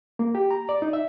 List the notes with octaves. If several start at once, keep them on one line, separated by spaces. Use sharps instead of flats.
A#3
G4
A#5
D5
D#4
E5